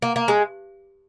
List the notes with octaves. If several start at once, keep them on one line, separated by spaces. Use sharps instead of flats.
A#3
A#3
G#3